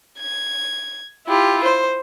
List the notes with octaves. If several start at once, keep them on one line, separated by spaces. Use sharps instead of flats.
G#6
E4 F4 G4
C5